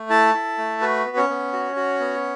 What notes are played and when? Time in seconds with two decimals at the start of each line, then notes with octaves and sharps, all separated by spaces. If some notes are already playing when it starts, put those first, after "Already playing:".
Already playing: A3
0.10 E4 A4 A5
0.34 E4
0.58 A3
0.81 F#4 B4
1.05 B3
1.17 C#4 C#5
1.29 B3
1.53 F#4
1.76 F#4
2.00 B3